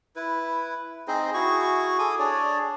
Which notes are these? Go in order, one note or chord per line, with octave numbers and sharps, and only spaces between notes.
E4 B4
C4 D#4 G#4 C5
E4 F#4 G#4 C#6
A4 G#5 D6 D#6
D4 G#4 C#5 D5